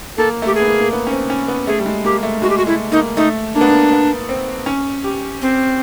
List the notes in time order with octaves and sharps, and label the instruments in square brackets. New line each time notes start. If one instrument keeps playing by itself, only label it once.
[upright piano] A#3 [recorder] A4
[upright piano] A3 [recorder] G4
[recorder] G#4
[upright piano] B3
A#3
A#3
B3
C#4
C4
C#4
B3
[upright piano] A3 [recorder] G#4
[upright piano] G3
G#3
[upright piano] A#3 [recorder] G4
[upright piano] A3
[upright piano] G#3 [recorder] F#4
[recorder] G4
F#4
[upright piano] A3 [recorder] E4
[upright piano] A#3 [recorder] D#4
[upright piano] A3 [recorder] D#4
[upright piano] A#3 [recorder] D4
[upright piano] B3
A#3
B3
C4
C#4
G4
[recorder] C4